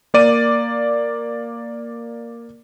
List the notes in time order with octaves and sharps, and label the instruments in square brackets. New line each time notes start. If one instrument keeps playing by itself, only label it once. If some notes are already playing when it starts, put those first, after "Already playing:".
[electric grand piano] A#3 D5 D#7